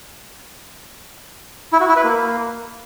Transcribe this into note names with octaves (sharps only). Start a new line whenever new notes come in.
E4
F#4
E4
B4
A#3